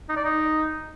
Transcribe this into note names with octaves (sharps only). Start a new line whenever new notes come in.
D#4
D5
D#4